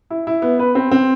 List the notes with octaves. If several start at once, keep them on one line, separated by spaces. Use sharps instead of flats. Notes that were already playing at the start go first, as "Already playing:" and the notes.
E4
E4
B3
B4
C4
C4